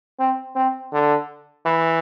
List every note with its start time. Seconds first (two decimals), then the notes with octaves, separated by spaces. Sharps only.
0.19 C4
0.56 C4
0.92 D3
1.66 E3